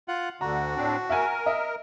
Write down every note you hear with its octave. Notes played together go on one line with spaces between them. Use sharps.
F4 F#5
D2 D3 F#4 A#5
A2 C4 D4
A#4 E5 F#5 G#5
D#5 E5